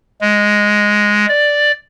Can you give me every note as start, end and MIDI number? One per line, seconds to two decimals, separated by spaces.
0.21 1.26 56
1.29 1.72 74